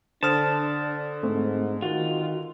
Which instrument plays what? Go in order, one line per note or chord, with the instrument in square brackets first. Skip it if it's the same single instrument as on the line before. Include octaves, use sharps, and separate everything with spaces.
[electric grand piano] D3 D#6 F6 [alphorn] D4 [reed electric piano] C5 [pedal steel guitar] A5
[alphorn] G#2 [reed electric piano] A3 C4
[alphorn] D#3 [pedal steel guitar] F4 [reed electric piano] F#4